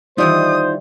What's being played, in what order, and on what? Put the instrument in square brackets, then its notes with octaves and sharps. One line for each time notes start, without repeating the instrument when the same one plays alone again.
[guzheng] D#3 E3 G3 [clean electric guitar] D#4 F4 [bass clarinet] C5 [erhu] D#6